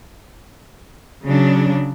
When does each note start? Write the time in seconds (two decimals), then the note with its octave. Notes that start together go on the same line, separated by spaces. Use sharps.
1.24 C#3 F#3 D4